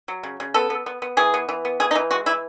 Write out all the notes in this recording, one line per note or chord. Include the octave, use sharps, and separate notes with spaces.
F#3
C#3
C#3
B3 A4
B3
B3
B3
E3 G#4
B3
E3
B3
E3 G#4
D#4
E3
G#3 F#4
E3 E4